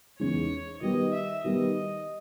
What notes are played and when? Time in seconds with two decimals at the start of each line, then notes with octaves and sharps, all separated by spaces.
0.19 E2 C#3 G#3 D#4 C#5
0.81 D#3 G3 B3 G4 D#5
1.13 E5
1.43 D#3 G3 B3 D#5